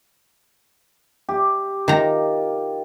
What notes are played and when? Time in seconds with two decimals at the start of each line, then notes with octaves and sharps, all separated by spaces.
1.29 G4
1.88 D#3 F4 A#5